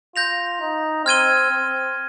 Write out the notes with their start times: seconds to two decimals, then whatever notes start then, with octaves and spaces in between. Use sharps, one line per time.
0.16 F4 G6 A#6 F7
0.61 D#4
1.05 C4 F6 G#6 D#7 G7
1.51 C4